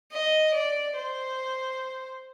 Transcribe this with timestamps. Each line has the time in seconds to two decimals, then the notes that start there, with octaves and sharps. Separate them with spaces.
0.12 D#5
0.55 D5
0.96 C5